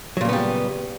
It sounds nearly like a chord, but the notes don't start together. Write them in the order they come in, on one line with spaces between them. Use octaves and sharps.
F#3 A#2 C#3 B3 G3